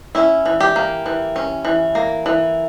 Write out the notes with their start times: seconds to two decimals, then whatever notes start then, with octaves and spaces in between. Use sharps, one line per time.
0.15 C#4 E4
0.46 E3
0.60 G4
0.76 A#3
1.06 E3
1.36 C#4
1.65 E3
1.95 A#3
2.26 E3